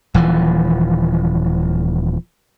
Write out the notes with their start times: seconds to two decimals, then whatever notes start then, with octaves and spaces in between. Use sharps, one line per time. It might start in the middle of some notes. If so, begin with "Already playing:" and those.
0.14 D#1 E3 F3